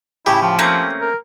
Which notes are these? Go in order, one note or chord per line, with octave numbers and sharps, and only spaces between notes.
A2 C#3 E4 G4
F3
A3 A#3 C4 C#4 A#5
A#4